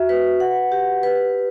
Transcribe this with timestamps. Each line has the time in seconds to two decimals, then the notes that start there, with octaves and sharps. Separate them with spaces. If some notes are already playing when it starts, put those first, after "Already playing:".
Already playing: F#4 E5
0.09 B4
0.40 F#5
0.72 G4
1.03 B4